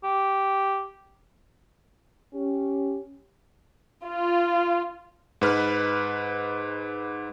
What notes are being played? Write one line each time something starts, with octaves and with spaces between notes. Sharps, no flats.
G4
C#4 G4
F4
G#2 B4 F6